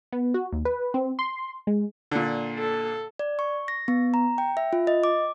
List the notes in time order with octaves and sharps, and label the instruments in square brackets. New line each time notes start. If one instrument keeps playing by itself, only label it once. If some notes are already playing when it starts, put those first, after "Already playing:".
[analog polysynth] B3
F#4
D#2
B4
C4
C6
G#3
[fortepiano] A#2 D3
[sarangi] A4
[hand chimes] D5
C#6
A#6
B3
A#5
G5
E5
F4
D#5
D6